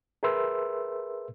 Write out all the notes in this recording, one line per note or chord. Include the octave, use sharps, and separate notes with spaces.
G#4 A#4 B4 E5 C6 E6